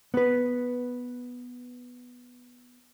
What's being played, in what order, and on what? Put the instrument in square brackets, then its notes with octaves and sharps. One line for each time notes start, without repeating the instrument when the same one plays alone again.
[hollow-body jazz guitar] B3 B4